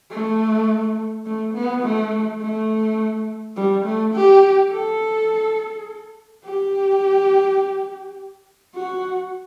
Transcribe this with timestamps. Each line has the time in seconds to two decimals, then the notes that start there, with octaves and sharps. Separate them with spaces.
0.10 A3
1.26 A3
1.54 B3
1.83 A3
2.41 A3
3.56 G3
3.86 A3
4.14 G4
4.71 A4
6.44 G4
8.75 F#4